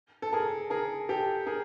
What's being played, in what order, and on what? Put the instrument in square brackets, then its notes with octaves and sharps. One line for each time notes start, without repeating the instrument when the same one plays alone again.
[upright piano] A4
G#4 A#4
G#4 A#4
G4 A4
G#4 A#4